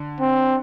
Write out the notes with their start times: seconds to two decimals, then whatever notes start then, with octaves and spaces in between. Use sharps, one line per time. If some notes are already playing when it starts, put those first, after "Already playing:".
Already playing: D3
0.20 C4